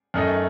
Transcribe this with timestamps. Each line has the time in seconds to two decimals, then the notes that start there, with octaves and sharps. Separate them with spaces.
0.14 F#2 D#3 A3 D#4